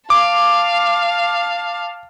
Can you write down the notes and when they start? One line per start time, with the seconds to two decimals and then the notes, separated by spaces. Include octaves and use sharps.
0.10 F5 A5 D6